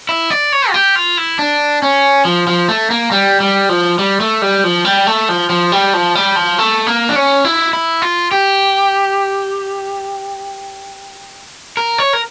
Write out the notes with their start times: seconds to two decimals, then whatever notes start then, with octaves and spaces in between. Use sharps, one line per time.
0.09 E4
0.30 D5
0.52 C#5
0.70 F4
0.74 G4
0.96 F4
1.17 E4
1.39 D4
1.82 C#4
2.25 F3
2.47 F3
2.69 A3
2.90 A#3
3.11 G3
3.40 G3
3.69 F3
3.99 G3
4.21 A3
4.42 G3
4.64 F3
4.85 G3
5.07 A3
5.29 F3
5.50 F3
5.72 G3
5.94 F3
6.15 G3
6.36 F3
6.58 A3
6.87 A#3
7.09 D4
7.16 C#4
7.45 E4
7.73 E4
8.02 F4
8.32 G4
11.77 A#4
11.98 C#5
12.13 A#4